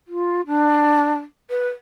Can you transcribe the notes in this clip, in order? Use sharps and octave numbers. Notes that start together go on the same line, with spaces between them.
F4
D4
B4